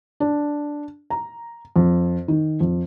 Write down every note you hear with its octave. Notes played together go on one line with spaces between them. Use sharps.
D4
A#5
F2
D#3
F2